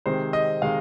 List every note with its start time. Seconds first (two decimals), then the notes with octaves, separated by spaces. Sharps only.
0.06 C3 D#3 G#3 C4 C5
0.33 D#5
0.62 C3 D#3 G#3 C4 F5